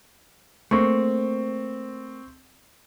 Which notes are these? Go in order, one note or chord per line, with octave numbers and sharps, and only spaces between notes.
A3 A#3 C4 C#6